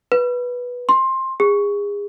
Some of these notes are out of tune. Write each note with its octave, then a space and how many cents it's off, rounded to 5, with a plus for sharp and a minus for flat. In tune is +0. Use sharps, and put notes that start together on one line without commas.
B4 -10
C6 +15
G#4 -30